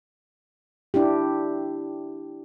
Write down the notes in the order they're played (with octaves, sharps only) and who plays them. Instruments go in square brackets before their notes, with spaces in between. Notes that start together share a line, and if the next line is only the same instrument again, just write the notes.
[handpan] D4 E4 G4